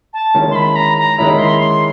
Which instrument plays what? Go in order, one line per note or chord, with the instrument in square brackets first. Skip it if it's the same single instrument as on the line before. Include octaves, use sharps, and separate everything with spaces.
[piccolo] A5
[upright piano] D#3 G#3 C#4 E4
[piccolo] C6
B5
A#5
A#5
[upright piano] D#3 G#3 C#4 E4 [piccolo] B5
[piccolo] C6
C6